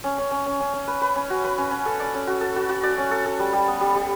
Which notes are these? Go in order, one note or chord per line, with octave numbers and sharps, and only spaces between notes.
C#4
C#4
C#4
C#4
C#4
C#4
B4
B4
C#4
F#4
B4
C#4
C#4
A4
D5
C#4
F#4
A4
F#4
F#4
D5
C#4
A4
A4
G3
G3
B3
G3
G3